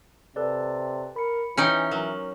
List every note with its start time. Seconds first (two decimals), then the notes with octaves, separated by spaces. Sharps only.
0.36 C3 A4 B4 D5
1.16 A#4 B5 C#7
1.57 E3 C#4 D#4 G5
1.91 F#3 A#4